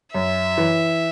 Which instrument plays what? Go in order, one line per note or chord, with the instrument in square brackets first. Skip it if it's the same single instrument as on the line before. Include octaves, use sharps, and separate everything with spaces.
[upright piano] F#2 [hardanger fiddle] E5
[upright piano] E3